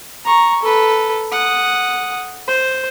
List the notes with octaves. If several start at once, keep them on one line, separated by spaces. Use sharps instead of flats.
A#5 C#6
A4 B4
F#5 D#6
C5